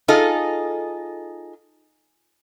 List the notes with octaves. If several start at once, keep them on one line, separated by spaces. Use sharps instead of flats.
D#4 F4 G#4 A4 D#5